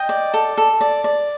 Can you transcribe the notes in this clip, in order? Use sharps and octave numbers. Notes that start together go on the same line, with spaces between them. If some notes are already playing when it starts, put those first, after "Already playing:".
Already playing: D#5 G5
D5
A4
A4
D5
D5